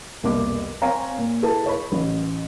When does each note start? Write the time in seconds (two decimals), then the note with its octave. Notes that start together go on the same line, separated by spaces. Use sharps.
0.23 F1 C2 B2 A#3 D6
0.82 C4 C#5 F5 G#5 A#5
1.18 A#2
1.43 E4 G#4 A4 B4 A5
1.66 C#5 B5
1.92 A1